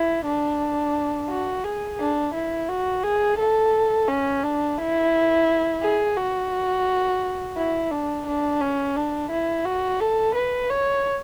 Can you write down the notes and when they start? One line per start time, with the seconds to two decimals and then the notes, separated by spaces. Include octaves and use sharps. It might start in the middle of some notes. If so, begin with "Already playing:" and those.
Already playing: E4
0.25 D4
1.29 F#4
1.64 G#4
1.99 D4
2.35 E4
2.69 F#4
3.04 G#4
3.39 A4
4.08 C#4
4.43 D4
4.78 E4
5.82 G#4
6.17 F#4
7.57 E4
7.91 D4
8.27 D4
8.61 C#4
8.96 D4
9.31 E4
9.65 F#4
10.00 A4
10.35 B4
10.70 C#5